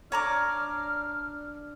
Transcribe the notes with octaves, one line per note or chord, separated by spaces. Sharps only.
D4 C#5 A#5 D6 F6